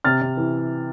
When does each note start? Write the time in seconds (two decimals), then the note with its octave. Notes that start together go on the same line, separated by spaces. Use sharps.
0.04 C3 F6 A6
0.21 C3
0.37 E3